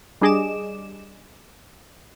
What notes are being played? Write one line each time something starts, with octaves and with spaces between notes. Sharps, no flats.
G3 D4 G#4 D#5 D6 E7